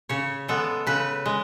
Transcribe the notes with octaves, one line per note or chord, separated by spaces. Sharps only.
C#3 C#5
G#3 B3 A4
C#3 B4
G#3